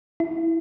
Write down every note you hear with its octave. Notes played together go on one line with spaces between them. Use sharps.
E4